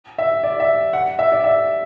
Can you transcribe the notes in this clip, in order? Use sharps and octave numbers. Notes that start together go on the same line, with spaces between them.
E5
D5
E5
F#5
E5
D5
E5